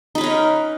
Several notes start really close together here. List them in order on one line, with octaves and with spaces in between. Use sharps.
D#4 B4 C#4 A#4